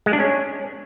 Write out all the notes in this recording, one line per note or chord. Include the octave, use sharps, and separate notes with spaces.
G#3
D4
C#4